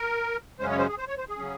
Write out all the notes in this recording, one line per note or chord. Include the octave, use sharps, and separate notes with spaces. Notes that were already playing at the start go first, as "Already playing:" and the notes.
Already playing: A#4
F#2 C#3 G#3 C#4 C5
C#5
C5
G#4
C5
C#5
C5
G#4
C#3 F#3 C#4